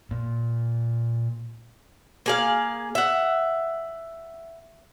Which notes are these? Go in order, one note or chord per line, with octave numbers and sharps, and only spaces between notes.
A#2
A#3 G#4 F5
E5 F#5